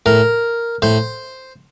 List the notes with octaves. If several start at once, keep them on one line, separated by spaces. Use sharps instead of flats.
A2 A#4
A2 C5